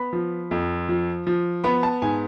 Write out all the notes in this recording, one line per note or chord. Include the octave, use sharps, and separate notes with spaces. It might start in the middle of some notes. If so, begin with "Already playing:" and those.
Already playing: B3 B5
F3
F2
F3
F3
B3 B5
A5
G#2 G#5